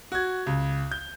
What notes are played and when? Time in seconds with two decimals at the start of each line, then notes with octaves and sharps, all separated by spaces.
0.12 F#4 G#6
0.46 C#2
0.92 G6